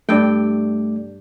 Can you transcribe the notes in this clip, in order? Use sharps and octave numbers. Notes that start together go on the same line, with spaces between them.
G2 A3 D5 G5